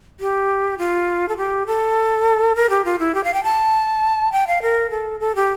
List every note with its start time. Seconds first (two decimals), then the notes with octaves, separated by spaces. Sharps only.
0.20 G4
0.78 F4
1.29 A4
1.37 G4
1.67 A4
2.55 A#4
2.70 G4
2.85 F4
2.99 E4
3.15 G4
3.24 F5
3.34 G5
3.44 A5
4.32 G5
4.47 F5
4.62 A#4
4.90 A4
5.20 A4
5.35 G4